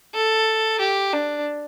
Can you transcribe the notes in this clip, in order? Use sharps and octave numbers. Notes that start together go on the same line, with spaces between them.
A4
G4
D4